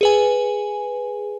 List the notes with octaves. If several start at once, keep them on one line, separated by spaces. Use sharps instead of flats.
G#4 B4 G#5